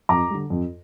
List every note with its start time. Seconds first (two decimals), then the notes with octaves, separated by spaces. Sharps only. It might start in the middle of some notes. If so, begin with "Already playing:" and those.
0.09 F2 A#5 D6
0.30 D3 G3
0.50 F2